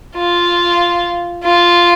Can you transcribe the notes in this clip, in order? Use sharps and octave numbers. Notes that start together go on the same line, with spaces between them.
F4
F4